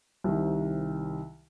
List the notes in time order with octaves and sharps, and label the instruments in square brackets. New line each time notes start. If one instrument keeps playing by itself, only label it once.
[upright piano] C2 C3 D#3